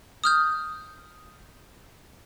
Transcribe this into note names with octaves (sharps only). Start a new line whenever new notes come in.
D#6 F6 G6